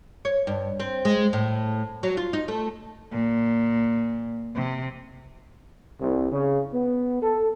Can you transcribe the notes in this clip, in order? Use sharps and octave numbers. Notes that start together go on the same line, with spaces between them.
C#5
G2
C4
G#3
A2
F#3
F4
D#4
A3
A#2
C3
C2
C#3
B3
A4